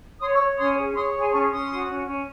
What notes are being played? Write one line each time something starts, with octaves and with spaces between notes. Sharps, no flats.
C#5 C6 D#6
C#6 E6
C#5
C#4 C6 D#6
G#4
C#5 C6 D#6
G#4
G#5 C6
C#4 A5 C#6
C#4 C6 D#6
F#4
C#4
C#4